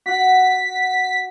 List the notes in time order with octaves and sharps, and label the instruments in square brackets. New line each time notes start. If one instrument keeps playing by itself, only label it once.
[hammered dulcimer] F#4 F#5 [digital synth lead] B6